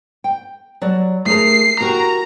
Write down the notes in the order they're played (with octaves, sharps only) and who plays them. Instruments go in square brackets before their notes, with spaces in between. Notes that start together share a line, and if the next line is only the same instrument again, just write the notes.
[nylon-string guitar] G5
F#3 G3 D5
[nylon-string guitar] A3 G#4 A#4 [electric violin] C7
[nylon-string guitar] F#4 G4 A#4 [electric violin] A#5